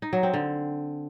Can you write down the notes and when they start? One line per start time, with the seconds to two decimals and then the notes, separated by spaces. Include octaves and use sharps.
0.02 D#4
0.13 F#3
0.23 C4
0.34 D3